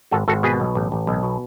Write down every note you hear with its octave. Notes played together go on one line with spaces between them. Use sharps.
G#1 F#4 A4
G#1 F#4 A4
B2 G#4 B4
B1
A1
A1
B1
B2